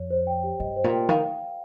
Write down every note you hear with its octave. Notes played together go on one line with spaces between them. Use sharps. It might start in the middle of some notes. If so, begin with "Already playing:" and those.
Already playing: F2 C#5
C5
G5
G4
G2 D#5
C5
A#2
G5
D#3 F5